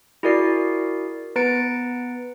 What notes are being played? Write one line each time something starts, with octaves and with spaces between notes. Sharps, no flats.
E4 F#4 G#4 A#4 D5 C7
B3 B4 A#5 A6 C#7 D7